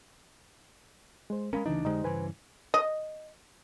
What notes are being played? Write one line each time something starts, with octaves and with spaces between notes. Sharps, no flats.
G#3 C5
G#3 A#3 C#4 A#4 F5 B5
D2 C#3 E3 D4 D#4
F2 D3 G#3 D#4 G4 C5
G2 C#3 E3 B4 C5 G#5
D#5